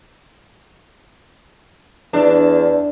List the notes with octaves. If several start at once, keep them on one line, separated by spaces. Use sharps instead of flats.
E2 D4